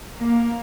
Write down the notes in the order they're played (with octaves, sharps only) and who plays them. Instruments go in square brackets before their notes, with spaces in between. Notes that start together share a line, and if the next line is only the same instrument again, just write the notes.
[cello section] A#3